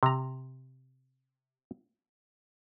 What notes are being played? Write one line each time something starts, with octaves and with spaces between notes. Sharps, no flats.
C3 A#5